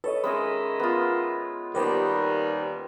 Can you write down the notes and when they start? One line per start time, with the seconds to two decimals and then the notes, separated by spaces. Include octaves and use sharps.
0.04 A4 B4 C#5 D#5
0.24 D#3 G#3 C#4 G#4 D#5 E5 B5
0.80 B3 F4
1.75 D#2 G3 B3 G4 A#4 C5 B5